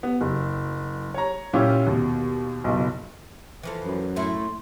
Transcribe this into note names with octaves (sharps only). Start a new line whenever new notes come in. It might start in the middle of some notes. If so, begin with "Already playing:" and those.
B3
F#1
C#5 A#5
A#2 C#4 E4 F4 G4
D#2 B2
F#1 B1
E3 F3 A4
F#2 B4
A2 A3 E4 C6